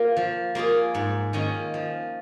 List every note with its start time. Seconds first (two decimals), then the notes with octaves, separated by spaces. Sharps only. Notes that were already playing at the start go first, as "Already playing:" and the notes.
Already playing: A#3 F4 A#4
0.17 F3
0.55 A#3 F4 G#4
0.95 G#2
1.33 D#3 A#3 C#4 F4
1.74 F3